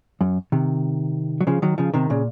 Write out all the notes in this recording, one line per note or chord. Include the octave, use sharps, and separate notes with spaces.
F#2
C3 D#3
F#3
C#3 F3
D#3 F#3
C#3 F3
C3 D#3
A#2 C#3